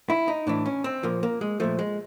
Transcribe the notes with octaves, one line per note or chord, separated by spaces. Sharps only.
E4
D#4
A2 E3 D4
C#4
C4
A#2 F3 A#3
A#3
G#3
A#2 F3 A3
G#3